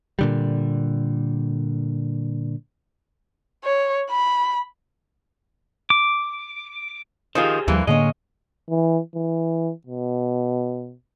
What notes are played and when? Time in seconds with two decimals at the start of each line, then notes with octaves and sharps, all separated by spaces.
0.19 A#2 D3 G3
3.64 C#5
4.10 B5
5.90 D6
7.35 D#3 F3 F4 G4 G#4 C5
7.68 D#2 D3 E3 F3 G3 A#3
7.87 A2 D3 G#3 A#3 C#4 D#5
8.69 E3
9.15 E3
9.86 B2